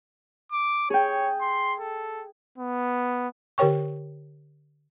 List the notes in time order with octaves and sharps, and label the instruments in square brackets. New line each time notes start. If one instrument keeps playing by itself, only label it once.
[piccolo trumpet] D6
[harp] G#4 G5 [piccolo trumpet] C#5
[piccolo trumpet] C6
A4
[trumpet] B3
[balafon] D3 G4 A#4 C#5 G5 C#6